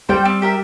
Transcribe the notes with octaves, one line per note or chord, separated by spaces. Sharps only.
G3 C5 G5
C4
G4 A#4 E5